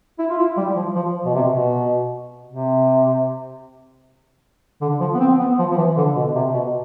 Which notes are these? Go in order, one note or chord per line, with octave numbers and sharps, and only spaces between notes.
E4
F4
E4
G3
F3
F3
B2
C3
B2
C3
D3
F3
B3
C4
B3
F3
F3
E3
D3
B2
C3
B2